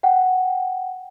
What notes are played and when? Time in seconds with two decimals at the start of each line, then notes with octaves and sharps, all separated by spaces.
0.03 F#5 G5